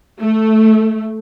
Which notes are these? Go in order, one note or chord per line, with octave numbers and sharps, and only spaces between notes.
A3